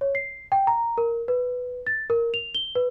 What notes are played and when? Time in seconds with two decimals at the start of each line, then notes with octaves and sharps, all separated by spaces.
0.01 C#5
0.15 C7
0.52 G5
0.67 A#5
0.98 A#4
1.28 B4
1.87 A6
2.10 A#4
2.34 F7
2.55 G7
2.75 B4